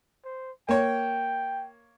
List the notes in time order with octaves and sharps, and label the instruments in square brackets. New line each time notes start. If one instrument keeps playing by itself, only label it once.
[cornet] C5
[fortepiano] A#3 C#5 [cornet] G5